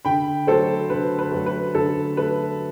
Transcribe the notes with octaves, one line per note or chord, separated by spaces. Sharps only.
D3 G5 B5
F#3 A3 A4 C5
D3 B4
B4
F#3 A3
B4
D3 A4
F#3 A3 B4